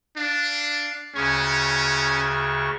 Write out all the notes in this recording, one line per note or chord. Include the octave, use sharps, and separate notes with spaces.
D4 F5
D2 C#3 C#4 C#6